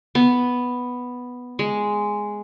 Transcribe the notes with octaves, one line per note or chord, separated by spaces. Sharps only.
B3
G#3